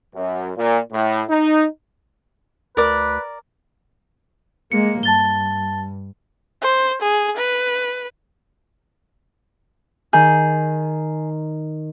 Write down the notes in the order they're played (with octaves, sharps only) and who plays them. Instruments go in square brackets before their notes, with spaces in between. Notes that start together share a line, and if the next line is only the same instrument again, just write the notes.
[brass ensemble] F#2
A#2
A2
D#4
[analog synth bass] D2 [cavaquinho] A#4 D5 [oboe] B4
[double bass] G#3 A#3 [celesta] C#7
[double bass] G2 [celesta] A5 A6 G7
[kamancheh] C5
G#4
B4
[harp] D#3 G6 [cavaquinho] G#4